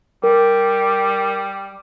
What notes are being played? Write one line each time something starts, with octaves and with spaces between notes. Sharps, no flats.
G3 A#4